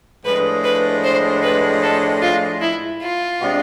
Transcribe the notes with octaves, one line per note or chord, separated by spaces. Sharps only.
A2 F3 G#3 D4 B4
B4
C5
B4
A4
F4
E4
F4
C3 G#3 D4